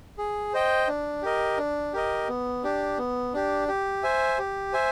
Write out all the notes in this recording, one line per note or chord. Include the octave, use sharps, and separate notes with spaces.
G#4
C5 D#5 G5
D4
G4 A#4 D#5
D4
G4 A#4 D#5
B3
D4 G4
B3
D4 G4
G4
C5 E5 G#5
G4
C5 E5 G#5